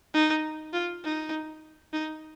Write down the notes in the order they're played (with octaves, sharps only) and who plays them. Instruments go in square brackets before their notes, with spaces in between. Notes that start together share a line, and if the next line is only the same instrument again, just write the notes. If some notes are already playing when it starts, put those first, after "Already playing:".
[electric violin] D#4
F4
D#4
D#4